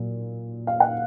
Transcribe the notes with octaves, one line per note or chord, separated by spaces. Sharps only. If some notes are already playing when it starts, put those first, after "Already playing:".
Already playing: A#2 F#3
F5
F#5